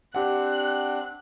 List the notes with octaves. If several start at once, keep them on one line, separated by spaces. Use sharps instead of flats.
C4 D4 G4 F#5 F#6